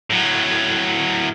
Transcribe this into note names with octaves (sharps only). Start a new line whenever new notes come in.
A2 F#3